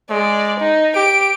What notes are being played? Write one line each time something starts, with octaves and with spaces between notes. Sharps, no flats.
G#3 D5
D#4
G4 D7